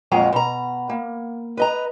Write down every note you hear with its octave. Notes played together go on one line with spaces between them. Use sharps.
F2 A#2 F#3 G#3 F5 A#5
B2 A#5
A#3
B4 D#5 A#5